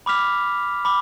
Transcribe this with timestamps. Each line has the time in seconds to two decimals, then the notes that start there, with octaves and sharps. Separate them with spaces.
0.06 B5 D6 F6 B6 F7
0.85 B5 D6